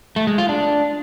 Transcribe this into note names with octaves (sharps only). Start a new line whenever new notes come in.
A3
G#3
F4
D4